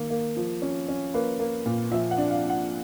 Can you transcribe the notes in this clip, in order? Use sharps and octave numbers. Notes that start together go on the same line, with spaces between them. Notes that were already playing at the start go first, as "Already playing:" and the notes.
Already playing: D#3 A#3
A#3
F3
C#4
C#4
A#3 B4
A#3
A#2
F3 E5
F#5
D4
F5
D4
F#5